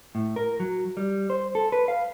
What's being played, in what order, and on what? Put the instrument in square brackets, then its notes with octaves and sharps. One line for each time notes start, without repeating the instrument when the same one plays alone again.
[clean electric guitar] A2
A#4
F#3
G3
C5
A4
B4
F5